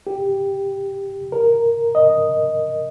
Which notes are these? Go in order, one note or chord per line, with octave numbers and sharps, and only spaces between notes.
G4
A#4
D#5